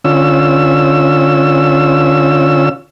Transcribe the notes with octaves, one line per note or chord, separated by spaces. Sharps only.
D3 C#4 F4 E6